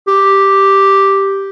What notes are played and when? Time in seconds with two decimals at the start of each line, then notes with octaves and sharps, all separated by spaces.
0.08 G4